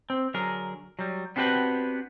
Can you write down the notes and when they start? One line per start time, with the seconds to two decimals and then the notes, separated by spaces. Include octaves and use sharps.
0.10 C4
0.34 D3 F#3 G#4 A#4
0.99 F#3 G3
1.36 B3 C4 D4 F#4 G4 B4